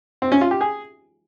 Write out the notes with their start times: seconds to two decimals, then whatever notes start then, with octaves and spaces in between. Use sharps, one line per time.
0.22 C4
0.32 C#4
0.41 F4
0.51 G4
0.61 G#4